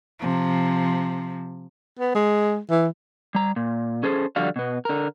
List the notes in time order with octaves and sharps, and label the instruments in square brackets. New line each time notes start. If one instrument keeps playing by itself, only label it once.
[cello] C3 F3
[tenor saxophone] B3
G#3
E3
[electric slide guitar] G3 A#5
A#2
C#4 G#4 A4 C5
D3 F3 G3 F#4 D5 F5
B2 B3
D3 A#4